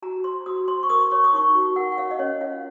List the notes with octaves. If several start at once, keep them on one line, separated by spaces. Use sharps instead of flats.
F#4 A#5
C5 C6
F#4 D#6
C5 C6
C#6
A#4 D#6
C#5 C#6
D#6
D#4 C#6
F#4
A#4 F#5
F#5
C#5 F5
D#5
C#4 C#5
F4 F5